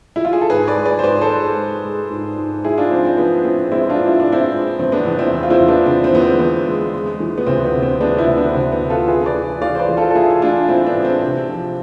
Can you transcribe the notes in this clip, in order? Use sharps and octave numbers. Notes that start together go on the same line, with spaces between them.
E4
F4
G#4
A4
G#2 G#4 B4
B4 D5
G#3
B4 D5
C5
G#2 B4 D5
A4 C5
G#3
G#3
G#3
G#2
G#2
G#3 E4 G#4
D4 F4
F3 C4
C4
F3 B3
A2 C4
G#3 C4 E4
D4 F4
A2
E4
D4
A2
C4 E4
G#3
E2 C4
B3 D4
E2
C4 E4
E2
F4
C4 E4
E2
B3 D4
D3 C4
C4
E2 B3
C4
E2 B3
G#3
G#3
E3
B3
D2 C4
B3
C3
C4
G#3 B3 D4
C4 E4
D2
B3 D4
B3
D2 C4
B3
C3
F4 A4
E3 G#4 B4
B4 D5
E3
E3 D5 F5
C5
B4 D5
E3
F4 A4
A4
E3 E4 G#4
G#4
A3 D4 F4
A2 C4 E4
B3 D4
A2
C4
C3
F3